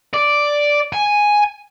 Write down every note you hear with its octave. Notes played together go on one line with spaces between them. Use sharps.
D5
G#5